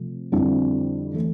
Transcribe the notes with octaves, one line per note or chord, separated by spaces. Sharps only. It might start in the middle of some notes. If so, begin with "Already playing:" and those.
Already playing: C3 F3 A3
F2 D3 G3 C4 E4
E3 A3